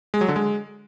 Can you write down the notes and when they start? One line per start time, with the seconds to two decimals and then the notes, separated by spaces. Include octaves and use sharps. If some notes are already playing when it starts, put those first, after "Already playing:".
0.14 G#3
0.21 F#3
0.28 D3
0.36 G#3